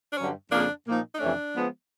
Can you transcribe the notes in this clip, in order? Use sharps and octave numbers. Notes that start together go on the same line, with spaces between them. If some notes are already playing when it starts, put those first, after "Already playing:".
D4
G2 D3 F#3 C#4
F2 C#3 F3 A#3 D4
A#2 F3 A#3 D#4
D#4
F2 C3 E3 A3 C#4 D4
F3 G#3 B3